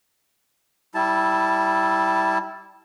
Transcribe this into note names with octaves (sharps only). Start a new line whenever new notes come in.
G3 E4 A5